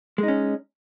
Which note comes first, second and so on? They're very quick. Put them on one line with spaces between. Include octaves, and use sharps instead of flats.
G#3 D#4 C#4